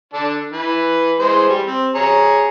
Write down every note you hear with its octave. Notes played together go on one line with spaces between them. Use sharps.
D3 D4 A4
E3 B4
E3 G#3 C5
G3
C4
G#4 C#5 A#5